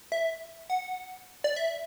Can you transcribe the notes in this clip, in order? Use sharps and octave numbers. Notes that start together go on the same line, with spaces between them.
E5
F#5
D5
E5